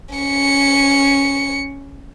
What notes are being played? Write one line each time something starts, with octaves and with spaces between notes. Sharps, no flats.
C#4 C#7